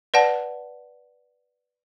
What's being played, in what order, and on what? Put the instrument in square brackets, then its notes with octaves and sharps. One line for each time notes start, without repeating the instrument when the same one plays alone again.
[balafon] B4 D5 F#5 A5